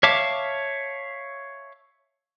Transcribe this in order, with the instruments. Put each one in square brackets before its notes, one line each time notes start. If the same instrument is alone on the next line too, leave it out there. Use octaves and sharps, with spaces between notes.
[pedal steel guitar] C#5 E5 F5 A5 D6